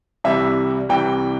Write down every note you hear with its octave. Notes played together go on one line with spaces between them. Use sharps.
C2 C3 E3 G3 E5
C2 C3 E3 G3 G5